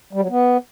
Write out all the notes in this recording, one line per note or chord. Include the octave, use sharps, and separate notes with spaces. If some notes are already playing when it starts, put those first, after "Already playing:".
G3
F#3
B3